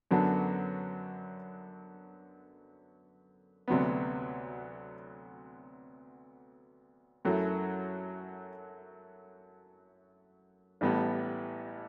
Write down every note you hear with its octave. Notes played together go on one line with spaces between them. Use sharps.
F#2 D3 F#3 B3 D4
D2 C3 F#3 B3
F#2 F#3 A3 E4
A1 A2 G3 B3